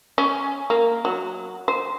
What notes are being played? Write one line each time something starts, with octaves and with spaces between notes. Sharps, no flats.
C#4
A#3
F#3
C5